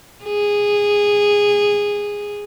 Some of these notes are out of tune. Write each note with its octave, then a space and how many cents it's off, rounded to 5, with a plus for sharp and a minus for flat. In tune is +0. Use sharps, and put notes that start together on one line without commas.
G#4 -15